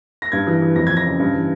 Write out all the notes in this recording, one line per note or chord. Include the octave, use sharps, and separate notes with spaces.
A#6
G2 G#6
E3
E3
F2 A#6
F2 G#6
A#6
C#3
G2
E3